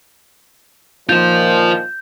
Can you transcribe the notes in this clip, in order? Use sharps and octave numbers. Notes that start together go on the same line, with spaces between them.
A#2 D#3 F3 F4 C5 G6